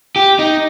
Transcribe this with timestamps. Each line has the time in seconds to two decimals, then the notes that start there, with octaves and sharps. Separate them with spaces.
0.16 G4
0.39 D#4